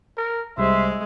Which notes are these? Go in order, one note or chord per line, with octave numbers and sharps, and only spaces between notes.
A#4
C2 G3 G#3 C5 E5 C6